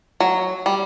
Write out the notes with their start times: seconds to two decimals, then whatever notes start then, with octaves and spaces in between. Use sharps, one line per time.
0.20 F#3
0.66 G3